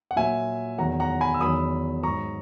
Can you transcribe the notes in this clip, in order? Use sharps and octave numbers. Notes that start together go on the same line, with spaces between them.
F#5
A#2 F#3 E5 G#5
E2 D#3 F#3 F#5 A#5
F#5 A#5
G#5 B5
E6
E2 D#3 F#3 B5 D#6
G#2 F#3 A#5 C#6